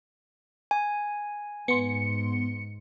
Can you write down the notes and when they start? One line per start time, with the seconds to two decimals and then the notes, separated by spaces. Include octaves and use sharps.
0.71 G#5
1.68 G#2 B3 C6 C#7